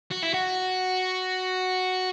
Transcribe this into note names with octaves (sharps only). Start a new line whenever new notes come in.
F#4
E4
F#4